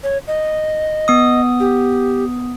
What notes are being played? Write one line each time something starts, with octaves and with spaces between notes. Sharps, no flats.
C#5
D#5
B3 D#6
G4